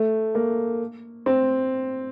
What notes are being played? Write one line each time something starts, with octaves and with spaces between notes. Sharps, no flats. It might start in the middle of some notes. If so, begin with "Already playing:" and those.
Already playing: A3
A#3
C4